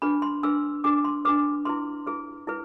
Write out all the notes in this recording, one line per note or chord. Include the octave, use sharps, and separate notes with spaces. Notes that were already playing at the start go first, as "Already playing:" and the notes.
D4 G#4 B4 B5
C6
D4 G#4 B4 E6
D4 G#4 B4 D6
C6
D4 G#4 B4 D6
E4 G#4 B4 C6
E4 G#4 B4
E4 G#4 B4